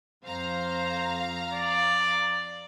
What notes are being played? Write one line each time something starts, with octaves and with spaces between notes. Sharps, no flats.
F2 C5 F5 A#5
D5